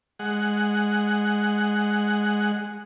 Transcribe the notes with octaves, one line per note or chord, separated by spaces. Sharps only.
G#3 F#5